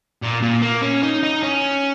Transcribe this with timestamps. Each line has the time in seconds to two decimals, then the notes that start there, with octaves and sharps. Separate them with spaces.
0.23 A#2
0.43 A#2
0.62 A#3
0.82 C#4
1.03 D#4
1.23 D#4
1.43 C#4